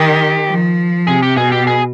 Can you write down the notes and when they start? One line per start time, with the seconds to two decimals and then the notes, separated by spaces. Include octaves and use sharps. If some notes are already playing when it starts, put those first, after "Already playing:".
Already playing: D#3 G4
0.47 F3
1.07 C3 G#4
1.23 G4
1.37 B2 G#4
1.52 G4
1.67 G#4